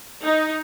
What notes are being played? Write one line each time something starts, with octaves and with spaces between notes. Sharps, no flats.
D#4